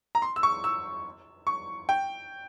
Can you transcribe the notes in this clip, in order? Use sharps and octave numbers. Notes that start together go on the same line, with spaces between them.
A#5
C6
E6
C#6
E6
C#6
G5